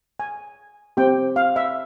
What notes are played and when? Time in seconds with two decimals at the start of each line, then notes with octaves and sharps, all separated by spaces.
0.20 G#5
0.97 C4 G4 G5
1.36 F5
1.56 E5